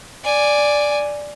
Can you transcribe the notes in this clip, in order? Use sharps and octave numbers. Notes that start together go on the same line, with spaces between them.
D5 G#5